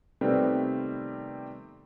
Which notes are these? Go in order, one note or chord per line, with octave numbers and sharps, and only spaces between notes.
C3 D#3 G3 A3 B3 C4